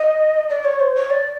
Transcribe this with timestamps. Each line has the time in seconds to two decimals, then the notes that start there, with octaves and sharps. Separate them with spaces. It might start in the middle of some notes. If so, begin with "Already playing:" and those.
Already playing: D#5
0.49 D5
0.64 C#5
0.80 C5
0.94 C#5
1.10 D5